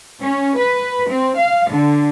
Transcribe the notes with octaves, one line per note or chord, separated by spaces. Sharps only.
C#4
B4
C4
F5
D3